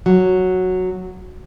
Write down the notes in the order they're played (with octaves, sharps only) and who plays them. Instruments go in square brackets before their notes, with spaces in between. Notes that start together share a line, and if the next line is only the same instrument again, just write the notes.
[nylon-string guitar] F#3